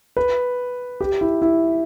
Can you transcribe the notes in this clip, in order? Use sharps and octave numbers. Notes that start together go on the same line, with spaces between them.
B4
G4
E4
E4